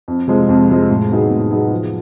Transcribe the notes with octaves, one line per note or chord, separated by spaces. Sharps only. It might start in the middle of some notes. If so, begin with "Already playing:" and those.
F2
C3 F3 G#3
F2
C3 F3 G#3
A2
F#3 B3 D#4 G#4
A2
F#3 B3 D#4 G#4
F3